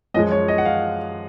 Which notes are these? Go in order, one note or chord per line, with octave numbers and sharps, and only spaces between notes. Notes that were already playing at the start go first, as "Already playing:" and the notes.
F#2 F3 G#3 D#5
C#5
D#5
F#5
F5